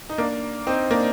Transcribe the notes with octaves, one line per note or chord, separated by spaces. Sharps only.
D#4
A#3 D4
C4 D#4
A#3 D4